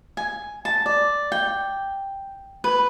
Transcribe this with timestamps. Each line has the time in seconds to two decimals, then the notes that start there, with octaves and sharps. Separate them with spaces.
0.17 G#5
0.65 A5
0.86 D5
1.32 G5
2.64 B4